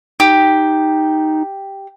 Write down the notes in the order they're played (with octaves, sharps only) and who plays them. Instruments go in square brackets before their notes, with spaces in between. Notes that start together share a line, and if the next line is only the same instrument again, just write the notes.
[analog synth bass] D#4 [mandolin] G4